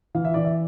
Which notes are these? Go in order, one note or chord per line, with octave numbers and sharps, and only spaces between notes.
E3 F5
E5
E3 D5
E5